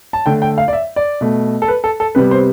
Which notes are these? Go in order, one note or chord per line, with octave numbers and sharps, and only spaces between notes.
A5
D3 A3 G5
G5
F5
D5
E5
D5
B2 A3
A4
B4
A4
A4
C3 G3 B3 B4
C5